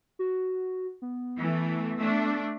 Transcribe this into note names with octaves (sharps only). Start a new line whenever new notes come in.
F#4
B3
E3 A3
A3 D4